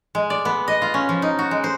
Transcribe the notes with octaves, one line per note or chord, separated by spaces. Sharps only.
G#3
D5
B3
D#5
F4
C#4
F3
D#4
F#4
G#3
C5